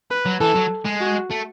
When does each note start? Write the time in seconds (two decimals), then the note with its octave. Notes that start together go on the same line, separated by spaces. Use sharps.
0.11 B4
0.26 F#3
0.41 E3 A4
0.55 F#3
0.85 G#3
1.01 F#4
1.30 A3